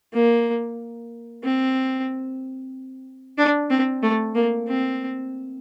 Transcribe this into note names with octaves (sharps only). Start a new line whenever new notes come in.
A#3
C4
D4
C4
A3
A#3
C4